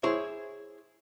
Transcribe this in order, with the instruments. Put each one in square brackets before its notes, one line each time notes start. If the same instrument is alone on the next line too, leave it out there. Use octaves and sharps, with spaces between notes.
[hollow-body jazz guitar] E4 G#4 C5 C#5